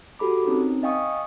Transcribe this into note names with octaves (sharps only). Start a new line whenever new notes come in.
F#4 G4 A4 B5 D6
C4 C#4 D#4 A#4
D#5 F5 G5 G#5 C#6 D#6